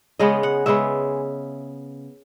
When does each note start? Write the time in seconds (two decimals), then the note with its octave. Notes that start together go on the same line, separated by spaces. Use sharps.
0.19 C#3 G#3 B3 D#5
0.43 F#5
0.66 C#3 G#3 B3 E5